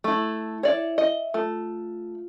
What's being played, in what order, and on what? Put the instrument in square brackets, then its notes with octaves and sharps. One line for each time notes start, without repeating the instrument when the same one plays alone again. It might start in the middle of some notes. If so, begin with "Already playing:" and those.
[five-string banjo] A3 E4
[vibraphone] E4 E5 [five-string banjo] C#5 D5
[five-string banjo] D#5 [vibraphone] E5
[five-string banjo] A3 [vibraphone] F4